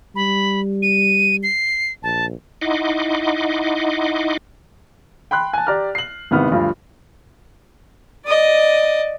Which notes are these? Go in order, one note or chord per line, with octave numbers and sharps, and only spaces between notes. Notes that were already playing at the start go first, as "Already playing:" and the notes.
G3 B5
D#7
C7
A#1 A5
D#4 E4 D#5 F#5 C6 D6
G5 B5 C6 F#6
G#5 A5
G4 D5 A#5 F6
C7 F#7
G#1 A2 C3 D#3 B3 F6
D2 G2 F3 F4
D5 D#5